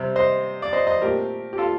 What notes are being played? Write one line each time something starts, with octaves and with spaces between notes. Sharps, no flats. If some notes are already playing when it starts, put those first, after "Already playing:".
Already playing: C3 G3 C4
C5 D#5
D5
C5 D#5
C5 D#5
A#2 A3 C4 G4 A#4
G4
F4 A4